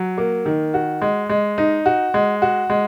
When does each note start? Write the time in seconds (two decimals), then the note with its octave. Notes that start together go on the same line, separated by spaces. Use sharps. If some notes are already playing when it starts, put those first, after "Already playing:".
Already playing: F#3
0.18 A#3
0.46 D#3
0.74 F#4
1.02 G#3
1.29 G#3
1.58 D#4
1.86 F#4
2.14 G#3
2.42 F#4
2.70 G#3